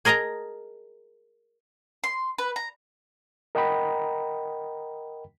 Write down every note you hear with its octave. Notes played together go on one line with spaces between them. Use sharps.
G#4 A#4 D#5 A5 A#5
C6
B4
A#5
A#4 D#5 F#5 G5 A#5 B5